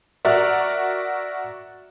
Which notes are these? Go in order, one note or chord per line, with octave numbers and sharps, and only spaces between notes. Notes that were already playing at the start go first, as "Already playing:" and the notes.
F#4 A#4 D5 E5